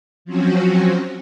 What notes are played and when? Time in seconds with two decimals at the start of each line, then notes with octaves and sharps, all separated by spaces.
0.25 F3 F#3 C4 C#4 F#4